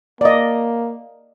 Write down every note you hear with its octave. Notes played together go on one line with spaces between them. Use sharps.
A#3 D5 D#5